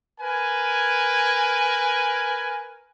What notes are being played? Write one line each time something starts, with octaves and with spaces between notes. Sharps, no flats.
A#4 B4 G#5